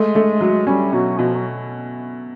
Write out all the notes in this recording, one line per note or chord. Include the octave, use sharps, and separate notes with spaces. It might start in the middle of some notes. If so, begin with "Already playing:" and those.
Already playing: G#3 A3
A3
F#3
G3 C#4
B2 F#3
B2 F3
F#3